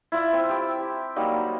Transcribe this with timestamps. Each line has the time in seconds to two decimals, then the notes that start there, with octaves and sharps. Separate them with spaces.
0.12 E4 F4 D5
0.33 C4
0.49 G4 D6 E6
0.80 G4
1.16 F#3 G3 A#3 D#4